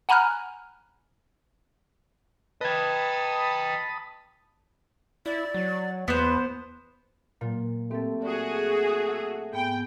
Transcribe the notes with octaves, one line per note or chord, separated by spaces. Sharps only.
F#5 G#5 A#5 B5 F6 F#6
B4 D#5 G5 A5 B5 D#6 G#6
E4 D5
F#3
E2 B3 B4 C5
A#2 F#3 A#3
A3 C4 G4 A4
F#4 G#4 D5
G#5 F#6
F#5 E6
G#2 B3 G5 G#5